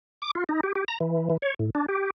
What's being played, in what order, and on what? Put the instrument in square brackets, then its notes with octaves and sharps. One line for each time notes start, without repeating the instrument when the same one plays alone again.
[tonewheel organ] D6
F4
D#4
G4
G4
A#5
E3
E3
C#5
A2
D4
G4